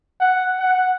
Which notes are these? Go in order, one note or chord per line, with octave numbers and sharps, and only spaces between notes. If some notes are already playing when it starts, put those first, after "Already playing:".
F#5
F#5